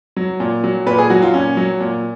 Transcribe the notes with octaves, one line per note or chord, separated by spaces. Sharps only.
F#3
A#2
F#3
A#2 B4
G#4
F#3 F#4
F4
A#2 C#4
F#3
A#2